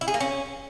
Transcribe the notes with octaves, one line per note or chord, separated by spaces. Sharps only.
E4
G#4
A#3
C#4